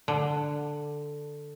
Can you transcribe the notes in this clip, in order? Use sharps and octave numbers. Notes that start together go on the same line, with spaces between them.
D3